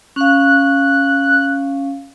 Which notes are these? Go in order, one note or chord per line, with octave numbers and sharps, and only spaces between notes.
C#4 F5 F#6